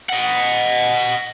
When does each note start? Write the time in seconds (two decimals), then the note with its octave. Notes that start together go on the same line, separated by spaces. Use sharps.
0.09 D#5 F#5